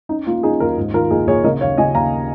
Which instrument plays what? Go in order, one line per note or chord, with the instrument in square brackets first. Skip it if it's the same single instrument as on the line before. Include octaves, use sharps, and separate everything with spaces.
[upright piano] C#4 D#4
A#3 F4
C#4 D#4 G#4
D#2 F4 A#4
G#2
D#3 F4 A#4
A#1 D#4 G#4
A#1 G#4 C#5
C#3 A#4 D#5
D#2 C#5 F5
C#3 D#5 G#5
D#2 F5 A#5